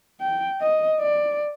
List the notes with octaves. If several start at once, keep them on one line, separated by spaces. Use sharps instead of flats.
G5
D#5
D5